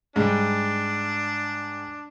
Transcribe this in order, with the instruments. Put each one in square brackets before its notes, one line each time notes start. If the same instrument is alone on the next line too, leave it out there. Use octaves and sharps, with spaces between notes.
[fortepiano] G#2 G3 [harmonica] D4